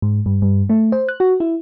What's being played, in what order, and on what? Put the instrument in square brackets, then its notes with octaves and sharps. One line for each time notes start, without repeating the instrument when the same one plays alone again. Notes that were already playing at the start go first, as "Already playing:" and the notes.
[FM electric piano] G#2
G2
G2
A3
C5
F#6
F#4
E4